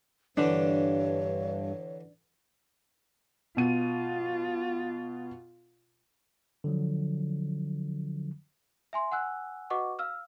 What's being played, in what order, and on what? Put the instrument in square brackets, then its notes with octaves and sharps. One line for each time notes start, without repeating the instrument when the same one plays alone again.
[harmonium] G2 [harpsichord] D3 E3 G4 [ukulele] D4 [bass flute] C#5
[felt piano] B2 D#7 [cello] F4
[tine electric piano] D3 F3 F#3
[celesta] E5 G#5 C6
F#5 G#5 E6 F#6
F#4 B4 D#5 F#5 C#6 D6
F5 E6 F6